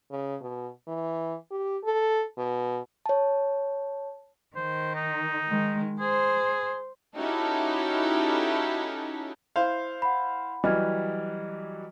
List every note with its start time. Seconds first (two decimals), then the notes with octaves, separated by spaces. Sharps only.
0.11 C#3
0.42 B2
0.87 E3
1.51 G4
1.84 A4
2.38 B2
3.06 C#5 A5
4.56 D#3 C5
4.95 D#4
5.47 D#3 G#3
6.00 G#4 C5
7.16 C#4 D#4 E4 F#4 G4 A4
9.56 E4 C5 F5
10.02 F#5 B5
10.64 E3 F#3 G3 D#5 F6 G#6